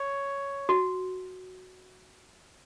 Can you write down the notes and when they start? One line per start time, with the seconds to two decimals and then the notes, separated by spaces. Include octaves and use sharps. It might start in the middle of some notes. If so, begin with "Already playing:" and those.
Already playing: C#5
0.69 F#4